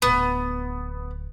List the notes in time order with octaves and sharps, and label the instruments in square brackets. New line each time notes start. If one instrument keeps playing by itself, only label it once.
[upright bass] D1 D3 [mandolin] B3